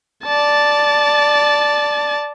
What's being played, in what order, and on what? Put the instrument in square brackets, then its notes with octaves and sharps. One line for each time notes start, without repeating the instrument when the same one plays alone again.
[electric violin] D5 A5